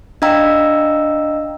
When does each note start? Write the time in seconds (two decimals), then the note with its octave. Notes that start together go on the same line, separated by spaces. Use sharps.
0.22 D4 D#5 F5 G5 A#5 E6